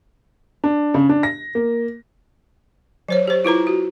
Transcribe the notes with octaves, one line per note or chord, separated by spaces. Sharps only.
D4
C#3
D4
A#6
A#3
F#3 C5 C#5
G4 C5
E4 F4 B4 A#5
F#4